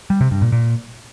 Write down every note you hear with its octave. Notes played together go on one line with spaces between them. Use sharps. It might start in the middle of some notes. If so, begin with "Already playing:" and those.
G3
C3
G2
A#2
A#2